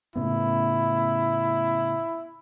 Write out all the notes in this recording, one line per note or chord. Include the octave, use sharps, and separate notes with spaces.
A2 C#3 B3 E4